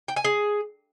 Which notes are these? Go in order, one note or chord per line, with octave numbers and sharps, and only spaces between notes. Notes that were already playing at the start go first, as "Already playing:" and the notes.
G5
G#5
G#4